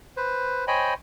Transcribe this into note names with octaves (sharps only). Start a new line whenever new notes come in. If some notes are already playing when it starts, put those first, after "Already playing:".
B4 C5
C5 C#5 D#5 G5 G#5 B5